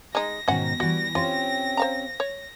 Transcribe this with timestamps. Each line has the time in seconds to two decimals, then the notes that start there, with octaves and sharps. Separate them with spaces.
0.15 G#3 D#4 A#6
0.48 G#2 B2 D#3 C#4 F#5
0.80 E3 G3 F#4
1.15 C4 C#4 F4 G4
1.77 C5 F5 A#5
2.20 C#5